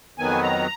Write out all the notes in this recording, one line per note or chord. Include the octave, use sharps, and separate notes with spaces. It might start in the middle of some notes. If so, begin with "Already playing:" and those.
F2 D#3 F#3 B3 G#5
A#5